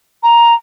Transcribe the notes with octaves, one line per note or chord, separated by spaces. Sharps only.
A#5